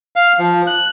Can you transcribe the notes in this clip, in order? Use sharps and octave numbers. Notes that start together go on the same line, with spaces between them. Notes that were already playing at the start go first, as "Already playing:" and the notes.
F5
F3
F#6